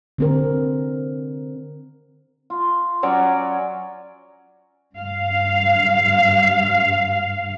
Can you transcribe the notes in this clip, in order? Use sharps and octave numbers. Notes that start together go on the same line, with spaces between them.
D3 C4 A#4
F4
F#3 C#4 D5
G2 F5